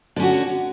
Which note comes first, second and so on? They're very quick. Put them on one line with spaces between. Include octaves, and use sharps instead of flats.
D3 C#4 F#4